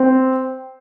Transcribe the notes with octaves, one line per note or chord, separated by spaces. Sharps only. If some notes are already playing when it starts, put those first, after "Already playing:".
Already playing: C4